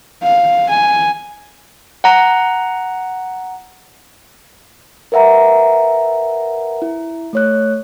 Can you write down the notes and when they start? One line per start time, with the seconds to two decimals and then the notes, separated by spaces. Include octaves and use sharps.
0.23 F5
0.69 G#5
2.04 F#5 A#5
5.12 A#4 B4 E5 F#5 A#5
6.82 E4
7.33 A3 C#5 F#6